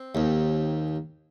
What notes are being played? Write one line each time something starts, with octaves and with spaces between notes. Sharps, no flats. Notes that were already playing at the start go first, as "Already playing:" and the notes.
Already playing: C4
D#2